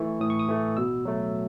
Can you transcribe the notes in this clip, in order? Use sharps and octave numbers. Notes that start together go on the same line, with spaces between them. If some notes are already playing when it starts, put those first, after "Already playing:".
Already playing: E3 A3 C#6
A2 D#6
C#6
D#6
E3 A3
B2 E6
F#3 A3